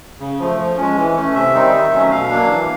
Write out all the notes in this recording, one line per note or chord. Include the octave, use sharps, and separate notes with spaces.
C#3
F3 A3
F3
G#3 C#4
E3
A3 C#4
C3 E5
D#3 G3 C4 D#4
D#3
F#3 A3 C#4
B2 F5
F#3 A#3 D4
E3